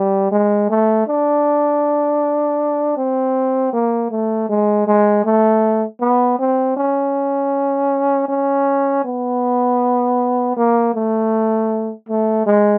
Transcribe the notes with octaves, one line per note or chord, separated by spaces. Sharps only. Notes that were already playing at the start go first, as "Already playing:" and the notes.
Already playing: G3
G#3
A3
D4
C4
A#3
A3
G#3
G#3
A3
B3
C4
C#4
C#4
B3
A#3
A3
A3
G#3